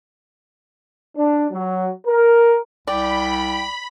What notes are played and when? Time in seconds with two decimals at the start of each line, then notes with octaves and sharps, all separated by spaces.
1.17 D4
1.50 F#3
2.07 A#4
2.87 C2 D5 G5 B5